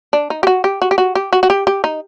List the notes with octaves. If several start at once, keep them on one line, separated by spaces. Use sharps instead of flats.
D4
D#4
G4
F#4
G4
F#4
G4
F#4
G4
F#4
F#4
G4
G4
D#4